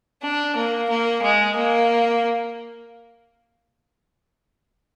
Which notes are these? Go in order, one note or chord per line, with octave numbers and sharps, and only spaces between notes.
D4
A#3
A#3
G#3
A#3